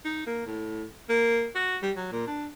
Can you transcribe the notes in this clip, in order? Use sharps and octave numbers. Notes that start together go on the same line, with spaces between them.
D#4
A#3
A2
A#3
F#4
G3
F#3
A#2
D4